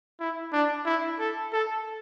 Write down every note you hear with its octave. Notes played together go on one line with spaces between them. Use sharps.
E4
D4
E4
A4
A4